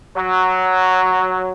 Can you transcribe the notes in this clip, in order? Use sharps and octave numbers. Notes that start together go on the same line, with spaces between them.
F#3